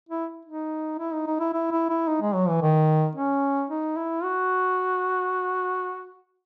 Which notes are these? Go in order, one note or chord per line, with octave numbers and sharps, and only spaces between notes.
E4
D#4
E4
D#4
D#4
E4
E4
E4
E4
D#4
G#3
F#3
E3
D#3
C#4
D#4
E4
F#4